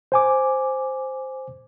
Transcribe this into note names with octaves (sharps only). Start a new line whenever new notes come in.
C5 G#5 D6